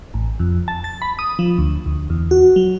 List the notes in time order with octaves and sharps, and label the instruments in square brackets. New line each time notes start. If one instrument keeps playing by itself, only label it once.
[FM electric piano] A1
F2
A5
A6
B5
D#6
F3
D2
D2
E2
F#4
F#3